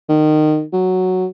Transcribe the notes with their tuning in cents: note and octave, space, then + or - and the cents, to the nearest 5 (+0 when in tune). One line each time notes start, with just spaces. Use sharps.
D#3 -20
F#3 +0